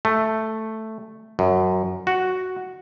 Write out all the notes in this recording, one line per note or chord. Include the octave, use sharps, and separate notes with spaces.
A3
F#2
F#4